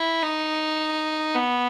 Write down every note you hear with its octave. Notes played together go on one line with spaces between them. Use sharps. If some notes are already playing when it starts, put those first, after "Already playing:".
Already playing: E4
D#4
B3